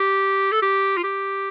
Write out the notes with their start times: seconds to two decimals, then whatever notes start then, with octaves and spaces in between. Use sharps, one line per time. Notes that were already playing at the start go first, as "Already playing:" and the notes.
Already playing: G4
0.52 A4
0.62 G4
0.97 F4
1.04 G4